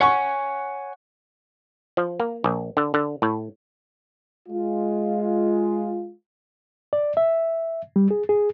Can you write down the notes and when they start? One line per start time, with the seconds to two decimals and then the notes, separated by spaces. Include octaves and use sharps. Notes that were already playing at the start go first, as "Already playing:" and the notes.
0.01 C#5 F#5 G#5 C#6
1.97 F3
2.20 A#3
2.44 A#1
2.77 D3
2.94 D3
3.22 A2
4.48 G#3 F4
6.93 D5
7.17 E5
7.96 G3
8.11 G#4
8.29 G#4